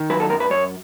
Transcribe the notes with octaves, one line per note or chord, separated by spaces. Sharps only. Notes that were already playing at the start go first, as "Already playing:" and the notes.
Already playing: D#3
F#3 B4
A4
F#2 A#4
B4
F#2 C#5